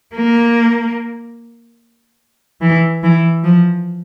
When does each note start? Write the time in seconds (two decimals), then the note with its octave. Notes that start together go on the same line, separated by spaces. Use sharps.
0.15 A#3
2.61 E3
3.03 E3
3.44 F3